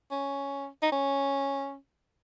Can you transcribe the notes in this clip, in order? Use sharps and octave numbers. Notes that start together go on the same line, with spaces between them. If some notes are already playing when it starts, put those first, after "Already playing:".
C#4
D#4
C#4